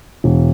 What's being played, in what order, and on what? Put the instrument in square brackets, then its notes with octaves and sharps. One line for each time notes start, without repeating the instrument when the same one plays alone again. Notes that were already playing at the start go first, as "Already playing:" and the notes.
[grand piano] E1